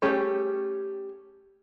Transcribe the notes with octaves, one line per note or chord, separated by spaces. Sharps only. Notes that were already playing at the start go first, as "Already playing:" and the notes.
G3 A3 C#4 G4 G#4